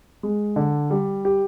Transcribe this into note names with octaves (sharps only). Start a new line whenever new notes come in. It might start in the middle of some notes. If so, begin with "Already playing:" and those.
G#3
D3
G3
G4